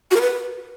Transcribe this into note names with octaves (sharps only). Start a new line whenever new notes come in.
F#4
A#4
B4